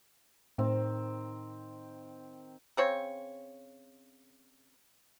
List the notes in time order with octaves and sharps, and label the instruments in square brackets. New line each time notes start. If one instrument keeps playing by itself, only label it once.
[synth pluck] A2 [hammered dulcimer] D#3 C4
[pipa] C#3 C4 C#5